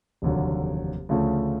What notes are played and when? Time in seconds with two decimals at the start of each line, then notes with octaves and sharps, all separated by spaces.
0.22 F1 D#2 D3 F#3
1.09 D2 C#3 F3 A3 C#4